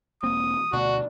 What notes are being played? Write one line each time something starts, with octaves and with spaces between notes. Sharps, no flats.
E1 A#3 C4 D#6
D2 B2 D4 F#4